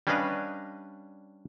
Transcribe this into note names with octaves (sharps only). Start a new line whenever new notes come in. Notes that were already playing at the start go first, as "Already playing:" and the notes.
G3 C#4 D4 B4 D#5 F5